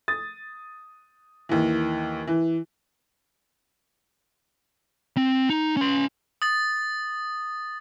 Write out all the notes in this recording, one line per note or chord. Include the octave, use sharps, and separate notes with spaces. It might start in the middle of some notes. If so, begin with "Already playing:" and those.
D#6 A6
D#2 E3
E3
C4
D#4
C#4 C6
D#6 A6 F#7